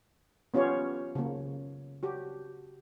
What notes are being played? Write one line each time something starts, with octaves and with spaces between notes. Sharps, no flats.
B3 C#4 F4 G4 C#5
C#3 A#3
F#4 G4